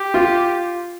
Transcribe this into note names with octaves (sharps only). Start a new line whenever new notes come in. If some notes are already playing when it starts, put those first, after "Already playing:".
Already playing: G4
F4